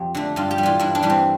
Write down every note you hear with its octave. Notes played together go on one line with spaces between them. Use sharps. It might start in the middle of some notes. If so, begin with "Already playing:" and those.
Already playing: F2 G4
D3 A3
G2 F4
G4
G3
E3 F4
G2 E4
D4
E3 G3
C4